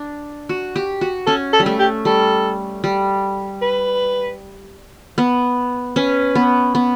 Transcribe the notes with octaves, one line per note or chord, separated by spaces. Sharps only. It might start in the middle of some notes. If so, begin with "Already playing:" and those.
Already playing: D4
F#4
G4
F#4
C#4 A4
A4
G3
A3
G4
G3 A4
G3
B4
B3
C#4 B4
B3
B3